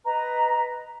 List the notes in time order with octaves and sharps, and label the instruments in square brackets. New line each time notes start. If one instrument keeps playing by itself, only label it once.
[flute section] B4 D#5 A#5